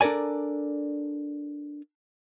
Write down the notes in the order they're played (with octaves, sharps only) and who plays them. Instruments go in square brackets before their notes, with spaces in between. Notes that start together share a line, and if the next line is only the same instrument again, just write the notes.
[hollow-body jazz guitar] D4 A4 A#4 D5 G#5